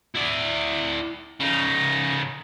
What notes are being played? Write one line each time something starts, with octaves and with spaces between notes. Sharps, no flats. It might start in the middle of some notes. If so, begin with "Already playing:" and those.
E4 D5
C#3 D#4